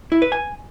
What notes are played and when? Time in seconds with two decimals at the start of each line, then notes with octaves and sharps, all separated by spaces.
0.12 E4
0.22 B4
0.32 G#5